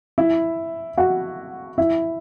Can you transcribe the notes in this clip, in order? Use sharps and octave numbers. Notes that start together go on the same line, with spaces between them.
E4 E5
F#4 F#5
E4 E5